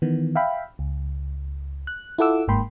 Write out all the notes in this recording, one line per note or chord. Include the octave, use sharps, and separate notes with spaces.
D#3 E3 B3
E5 F5 G5 B5
C#2
F#6
E4 F4 A4 F#5 D6 E6
G1 G#2 A#3 G5 B5 C6